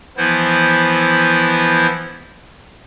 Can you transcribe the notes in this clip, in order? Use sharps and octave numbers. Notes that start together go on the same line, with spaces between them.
E3 F3 B3 E4 C5